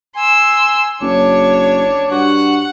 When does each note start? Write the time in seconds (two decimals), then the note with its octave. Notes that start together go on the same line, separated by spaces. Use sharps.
0.16 G#5 C6 E6
1.02 F#1 D4 C#5
2.11 G2 F#4 F#5